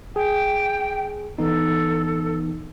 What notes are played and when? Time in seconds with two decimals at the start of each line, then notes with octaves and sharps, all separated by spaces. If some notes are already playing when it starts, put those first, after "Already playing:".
0.16 G#4 G5
1.38 E3 B3 D#4 A4